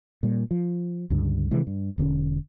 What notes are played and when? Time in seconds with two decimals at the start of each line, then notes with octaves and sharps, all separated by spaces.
0.23 A#2 G3
0.51 F3
1.10 C#2 G2 D3
1.51 C3 D#3 E3 G#3
1.67 G2
1.98 E1 D3 C4 C#4